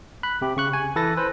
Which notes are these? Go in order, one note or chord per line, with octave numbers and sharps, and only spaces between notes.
B5 F#6
C3 G4
C#3 C#6 F#6
G#5
E3 A4 B4 A6 A#6
B4 C5